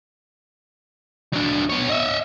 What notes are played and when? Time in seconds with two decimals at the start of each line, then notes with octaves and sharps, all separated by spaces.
1.33 F#3 D4
1.69 B3 C#5
1.89 D#5 E5